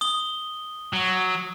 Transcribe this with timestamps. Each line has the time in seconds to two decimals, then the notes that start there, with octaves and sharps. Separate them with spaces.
0.01 D#6 G7
0.93 F#3